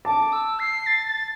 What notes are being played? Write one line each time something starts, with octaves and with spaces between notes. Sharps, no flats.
A5 D6
E6
C7
A6
A6